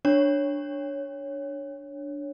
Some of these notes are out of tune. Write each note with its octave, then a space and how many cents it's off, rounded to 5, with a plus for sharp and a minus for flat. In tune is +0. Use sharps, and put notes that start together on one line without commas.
D4 +0 C#5 +0